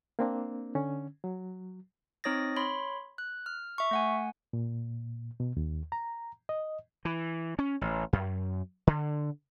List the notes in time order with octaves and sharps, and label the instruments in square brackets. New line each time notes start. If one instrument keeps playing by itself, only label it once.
[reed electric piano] A#3 C4 D4
D3 C#4
F#3
[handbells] C4 D#4 C#5 D#6 A6 A#6
C#5 B5 C6
F#6
F6
E5 C#6
A3 F#5 G#5
[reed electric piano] A#2
B2
D#2
A#5
D#5
[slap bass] E3
C#4
A1
F#2
D3